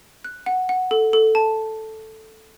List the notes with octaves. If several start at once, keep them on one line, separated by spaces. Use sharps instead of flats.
F#6
F#5
F#5
A4
A4
A5